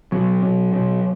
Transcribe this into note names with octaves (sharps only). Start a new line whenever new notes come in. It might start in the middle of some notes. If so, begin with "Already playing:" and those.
B2 F#3
B2
B2